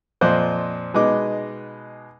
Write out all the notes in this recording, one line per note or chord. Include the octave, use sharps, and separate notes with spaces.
F2 A#2 F3 C5 D#5 F#6
B2 G#3 B3 D#4 D#5 D6